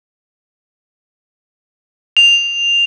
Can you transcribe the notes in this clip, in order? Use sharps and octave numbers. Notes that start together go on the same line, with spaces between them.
F7